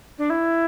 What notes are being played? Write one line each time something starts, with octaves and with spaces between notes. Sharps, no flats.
D4
E4